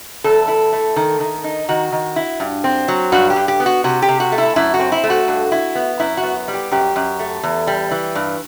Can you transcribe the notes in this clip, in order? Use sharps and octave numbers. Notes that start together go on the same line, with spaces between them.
E2 A4
E4
A3
D#3
D#3
D#4
D#3 F#4
D#3
E4
G2
C4
F#3
G2 F#4
G4
G2
G4
B3
F#4
C3 F#4
G4
C3
F#4
A3
E4
F#2 E4
F#4
C4
E4
A3
F#4
G2
E4
B3
F#2 E4
F#4
B3
G3
G4
F#2 G4
F#2
A3
E2
G3
E3
G2